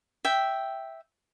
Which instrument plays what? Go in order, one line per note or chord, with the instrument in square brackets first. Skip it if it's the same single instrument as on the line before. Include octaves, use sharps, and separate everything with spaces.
[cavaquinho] E5 G5